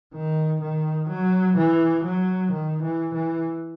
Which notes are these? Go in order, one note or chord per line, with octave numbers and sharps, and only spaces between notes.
D#3
D#3
F#3
E3
F#3
D#3
E3
E3